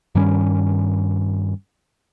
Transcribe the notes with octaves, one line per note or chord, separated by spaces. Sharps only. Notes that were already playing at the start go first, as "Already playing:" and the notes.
G2 D#3 G3 C#4